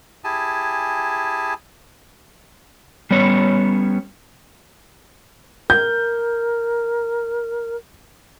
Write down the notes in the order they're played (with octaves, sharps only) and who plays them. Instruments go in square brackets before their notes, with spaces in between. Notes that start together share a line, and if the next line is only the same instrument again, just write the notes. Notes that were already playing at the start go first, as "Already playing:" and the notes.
[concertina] E4 G4 G#4 G#5 A5
[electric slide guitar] G3 B3 C#4 C#5
[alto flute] A#4 [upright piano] G6